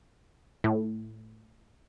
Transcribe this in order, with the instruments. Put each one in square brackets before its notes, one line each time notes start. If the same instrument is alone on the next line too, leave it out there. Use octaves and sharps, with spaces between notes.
[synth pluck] A2